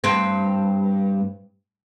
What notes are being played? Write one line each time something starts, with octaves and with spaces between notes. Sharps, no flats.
G2 C4